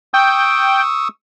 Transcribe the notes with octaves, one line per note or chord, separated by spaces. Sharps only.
G5 C#6 D#6 E6